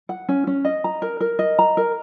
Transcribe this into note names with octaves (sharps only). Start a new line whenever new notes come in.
F#5
C#4
C#4
D#5
A#5
A#4
A#4
D#5
A#5
A#4